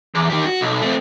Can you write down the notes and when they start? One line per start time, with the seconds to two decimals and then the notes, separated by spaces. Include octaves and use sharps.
0.15 E2
0.30 D#3 G4
0.46 F#4
0.61 B1
0.81 A3 C4